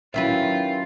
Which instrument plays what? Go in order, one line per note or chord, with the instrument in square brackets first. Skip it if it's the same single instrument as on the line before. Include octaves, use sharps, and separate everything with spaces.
[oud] D#3 E4 B4 [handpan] F#3 C#4 E5 [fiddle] F4